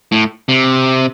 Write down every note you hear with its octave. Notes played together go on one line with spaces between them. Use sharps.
A2
C3